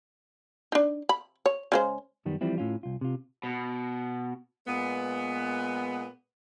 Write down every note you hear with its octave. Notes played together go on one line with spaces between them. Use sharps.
D4 D#4
B5
C#5
C#3 G#3 C5
F#2 D#3 G3 B3
E3 F3 G3 C4 E4
A2 C#4 F4
C2 F4
C3 F4
B2
A#2 G#3 B3